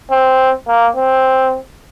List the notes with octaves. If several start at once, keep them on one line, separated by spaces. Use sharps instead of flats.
C4
A#3
C4